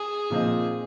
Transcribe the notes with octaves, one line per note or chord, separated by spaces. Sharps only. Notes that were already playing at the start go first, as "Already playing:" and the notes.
Already playing: G#4
A#2 F3 C4 D#4